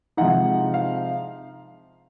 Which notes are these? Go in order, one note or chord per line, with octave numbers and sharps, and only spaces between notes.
C3 F3 G#3 D#4 F#5
F5